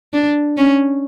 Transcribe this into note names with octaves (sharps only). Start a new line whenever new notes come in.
D4
C#4